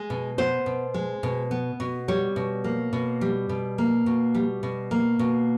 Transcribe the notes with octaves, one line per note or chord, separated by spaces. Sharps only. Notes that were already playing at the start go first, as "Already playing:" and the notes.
Already playing: G#3
B2
B3 C5
B2
G#3
B2
B3
B2
G3 C#5
B2
A#3
B2
G3
B2
A#3
B2
G3
B2
A#3
B2